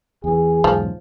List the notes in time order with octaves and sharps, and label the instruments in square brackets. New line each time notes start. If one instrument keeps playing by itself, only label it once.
[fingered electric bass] E2 E3 [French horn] G#4
[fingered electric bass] B1 E2 G#2 [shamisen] F3